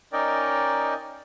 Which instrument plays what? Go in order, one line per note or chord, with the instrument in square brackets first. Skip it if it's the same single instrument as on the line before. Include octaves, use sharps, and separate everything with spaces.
[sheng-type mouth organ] C#4 D#4 A#4 D5 D#5 G5